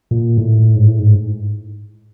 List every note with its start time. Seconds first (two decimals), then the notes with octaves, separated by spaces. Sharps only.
0.11 A#2
0.38 A2
0.76 G#2
0.87 A2
0.99 G#2